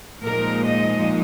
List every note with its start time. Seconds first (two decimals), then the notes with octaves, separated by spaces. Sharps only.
0.23 A#2 F3 G#3 D#4 A#4
0.64 D#5